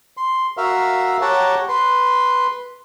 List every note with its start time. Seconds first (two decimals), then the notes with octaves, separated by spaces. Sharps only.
0.17 C6
0.57 F#4 A#4 E5 F5
1.22 G4 C#5 F#5 G5 A5 A#5
1.69 B4 C6